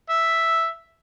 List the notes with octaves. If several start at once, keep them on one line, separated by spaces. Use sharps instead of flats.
E5